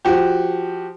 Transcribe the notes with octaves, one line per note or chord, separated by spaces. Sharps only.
F3 F#4 G4